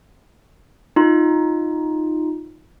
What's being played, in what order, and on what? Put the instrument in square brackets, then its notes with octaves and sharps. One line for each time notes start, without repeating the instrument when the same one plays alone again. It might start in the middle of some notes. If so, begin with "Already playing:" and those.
[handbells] D#4 F4